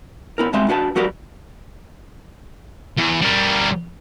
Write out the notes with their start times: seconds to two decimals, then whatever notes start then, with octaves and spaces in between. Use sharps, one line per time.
0.38 B3 E4 A#4
0.53 G2 B2 G#3 C4 E5 C6
0.69 D4 F#4 B4 A5
0.96 F#3 F#4 G4 A#4 B4 D5
2.98 E2
3.22 G3 A#4